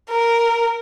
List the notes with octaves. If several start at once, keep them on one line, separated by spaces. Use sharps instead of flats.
A#4